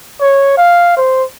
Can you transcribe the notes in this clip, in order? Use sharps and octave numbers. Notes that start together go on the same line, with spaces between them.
C#5
F5
C5